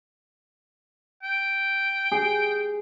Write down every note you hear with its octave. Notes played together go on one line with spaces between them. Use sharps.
G5
G#4